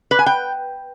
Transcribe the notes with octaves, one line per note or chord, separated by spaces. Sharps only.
B4
G#5
G5